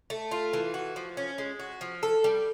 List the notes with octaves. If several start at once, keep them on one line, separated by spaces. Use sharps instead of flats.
A3
F4
E3
F#4
F3
C#4
G#3
F#4
F3
A4
G3